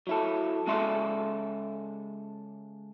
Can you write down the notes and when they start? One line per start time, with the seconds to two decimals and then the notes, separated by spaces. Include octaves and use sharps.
0.07 F#3 E4 A4
0.67 C#3 G#3 A4 E5 C6